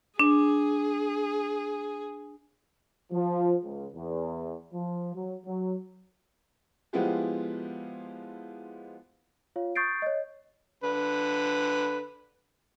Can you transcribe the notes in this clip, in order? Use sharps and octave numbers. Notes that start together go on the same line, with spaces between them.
D4 G#4
F3
C#2
E2
F3
F#3
F#3
F3 G#3 B3 E4 F4 G4
F4 C#5 F5
C#6 D#6 G6 A6 C7 D7
C#5 D#5
D3 B4